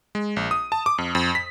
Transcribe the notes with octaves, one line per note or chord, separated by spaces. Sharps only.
G#3
A#1
D#6
A5
D6
F2
F2
B6